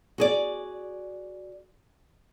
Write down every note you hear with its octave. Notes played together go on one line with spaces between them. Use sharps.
F#4 G#4 D5